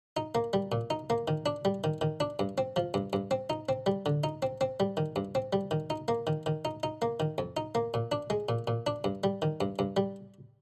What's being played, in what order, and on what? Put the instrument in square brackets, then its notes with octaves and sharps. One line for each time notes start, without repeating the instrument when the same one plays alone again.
[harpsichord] D#4
A#3
G3
A#2
D#4
A#3
D#3
D4
G3
D#3
D#3
D4
G2
C4
F3
G2
G2
C4
D#4
C4
G3
D3
D#4
C4
C4
G3
D#3
G2
C4
G3
D#3
D#4
A#3
D#3
D#3
D#4
D#4
A#3
D#3
F2
D#4
A#3
A#2
D4
G#3
A#2
A#2
D4
G2
G3
D#3
G2
G2
G3